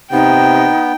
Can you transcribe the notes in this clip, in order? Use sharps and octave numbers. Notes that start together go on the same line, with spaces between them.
C3 B3 D#4 G5